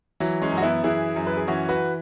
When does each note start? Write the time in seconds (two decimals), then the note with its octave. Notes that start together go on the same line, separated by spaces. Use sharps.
0.20 E3 F#3
0.42 G#3 C#4
0.52 F#2
0.57 F#4
0.63 B3 E4
0.84 E3 E4 G#4
1.16 F#2
1.27 B4
1.37 G#4
1.48 E3 C#4 F#4
1.69 F#4 B4